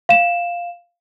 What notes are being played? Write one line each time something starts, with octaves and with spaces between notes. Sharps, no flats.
F5 E7